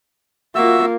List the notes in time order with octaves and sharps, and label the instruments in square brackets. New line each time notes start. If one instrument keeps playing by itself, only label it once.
[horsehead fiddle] A#3 F4 [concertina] F#4 E5 E6